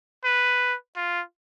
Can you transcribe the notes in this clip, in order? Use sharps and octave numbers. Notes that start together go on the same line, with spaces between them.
B4
F4